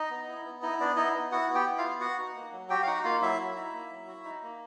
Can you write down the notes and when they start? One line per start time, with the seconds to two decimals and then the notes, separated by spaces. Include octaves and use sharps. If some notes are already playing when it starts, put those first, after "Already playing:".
Already playing: D#4 D#5
0.11 B3
0.28 E4
0.45 B3
0.62 D#4 E4 D#5
0.80 B3 D4 D5
0.96 D#4 E4 D#5
1.14 B3
1.32 E4 F#4 F#5
1.49 B3
1.54 G4 G5
1.66 E4
1.78 F4 F5
1.84 B3
2.00 F#4 F#5
2.19 D#4
2.35 A#3
2.52 F#3
2.70 F#4 G4 G5
2.83 F5
2.87 D#4 F#4 F#5
3.04 A#3 F4 F5
3.22 F#3 E4 E5
3.39 F#4
3.56 D#4
3.73 A#3
3.90 F#3
4.07 F#4
4.25 D#4
4.43 A#3